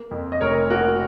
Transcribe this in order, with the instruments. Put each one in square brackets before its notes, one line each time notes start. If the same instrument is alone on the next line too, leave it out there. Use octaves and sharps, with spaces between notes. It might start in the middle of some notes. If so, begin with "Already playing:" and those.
Already playing: [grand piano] A#3
F2
D#5
F1 A#4 C#5
A#3 F#4 A#4